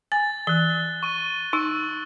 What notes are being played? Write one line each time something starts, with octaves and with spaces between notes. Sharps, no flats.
G#5 A6
E3 F#6 G7
C#6 D#7
D#4 C#6 E6